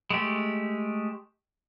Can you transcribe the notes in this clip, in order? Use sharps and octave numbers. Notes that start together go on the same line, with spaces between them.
G#3 A3 G4